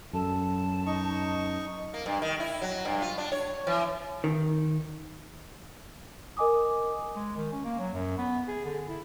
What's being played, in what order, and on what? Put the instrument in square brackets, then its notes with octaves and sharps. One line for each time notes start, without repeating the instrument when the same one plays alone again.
[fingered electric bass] F#2 [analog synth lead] A4 [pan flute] A5
[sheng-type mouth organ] D#4 C#6 [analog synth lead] D#5
[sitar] A#3
G2
D#3
E4
F#3
G2
F4
D4
C#5
E3
[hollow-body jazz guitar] D#3
[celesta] A#4 D#5 G#5 D6 D#6
[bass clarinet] G#3
D#3
C#4
A#3
F#3
F#2
B3
G#4
D3
E4